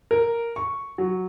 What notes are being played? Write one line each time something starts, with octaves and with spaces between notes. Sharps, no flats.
A#4
C#6
F#3